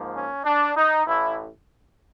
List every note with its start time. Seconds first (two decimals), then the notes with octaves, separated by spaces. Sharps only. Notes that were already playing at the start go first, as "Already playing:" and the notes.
Already playing: G#2 F3 A#3
0.14 C#4
0.45 D4
0.76 D#4
1.06 A1 A2 E3 E4